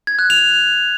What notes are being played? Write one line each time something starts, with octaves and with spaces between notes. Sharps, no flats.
G#6
F#6
F7